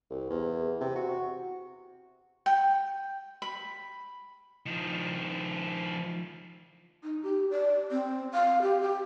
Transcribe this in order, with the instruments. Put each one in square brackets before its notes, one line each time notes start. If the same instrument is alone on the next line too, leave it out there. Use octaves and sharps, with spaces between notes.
[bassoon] C2
E2
C3
F#4
[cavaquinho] G5
B5
[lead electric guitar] D#3 F3
[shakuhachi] D#4
G4
D5
C4
F5
G4
G4